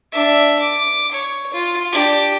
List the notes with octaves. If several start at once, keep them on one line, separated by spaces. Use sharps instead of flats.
D4 E5
D6
C#5
F4
D4 G4